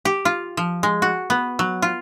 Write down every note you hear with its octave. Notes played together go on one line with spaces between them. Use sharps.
G4
F4
F3
G#3
F#4
B3
F#3
F4